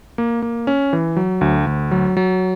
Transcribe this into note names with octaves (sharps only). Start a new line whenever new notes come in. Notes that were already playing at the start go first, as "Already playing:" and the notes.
A#3
A#3
C#4
E3
F#3
D2
D2
F#3
F#3